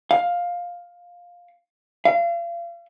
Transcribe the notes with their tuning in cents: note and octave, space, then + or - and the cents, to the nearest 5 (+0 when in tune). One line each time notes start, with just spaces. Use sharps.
F5 +10
F5 -35